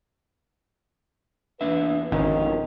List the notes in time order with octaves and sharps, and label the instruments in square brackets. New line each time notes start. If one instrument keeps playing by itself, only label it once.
[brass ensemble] E2 B4 [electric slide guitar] A#3 D4 E5
[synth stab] G#1 [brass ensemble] F2 [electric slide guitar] B2 D3 C#4 [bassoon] D#3